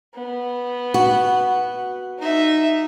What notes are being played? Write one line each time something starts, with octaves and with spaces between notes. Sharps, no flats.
B3
F#4
D#4 E5